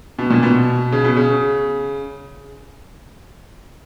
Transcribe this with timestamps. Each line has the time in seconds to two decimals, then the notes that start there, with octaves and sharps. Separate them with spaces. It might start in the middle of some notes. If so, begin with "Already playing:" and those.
0.19 B2
0.30 A#2
0.43 B2
0.92 C#3
1.04 B2
1.17 C#3